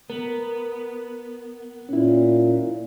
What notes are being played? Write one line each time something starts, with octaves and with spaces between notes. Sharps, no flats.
B3 A#4
A#2 C#4 E4